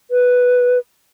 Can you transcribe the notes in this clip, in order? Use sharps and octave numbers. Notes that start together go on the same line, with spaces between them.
B4